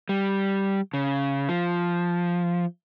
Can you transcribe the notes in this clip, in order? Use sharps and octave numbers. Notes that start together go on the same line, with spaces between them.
G3
C#3
F3